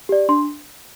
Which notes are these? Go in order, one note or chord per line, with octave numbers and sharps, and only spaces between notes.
G4 D5
D4 C6